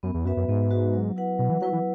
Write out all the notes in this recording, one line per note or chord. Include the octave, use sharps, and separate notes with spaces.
F#2 B3
E2
F#2 F#4 B4 E5
F#2
G#2 B3
F#4 B4 E5
F#3
E4 B4 F#5
B2 F#3
E3
F#3 E4 B4 F#5
E3